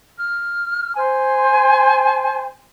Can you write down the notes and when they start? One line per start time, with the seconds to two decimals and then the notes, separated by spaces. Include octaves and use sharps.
0.18 F6
0.96 C5 G#5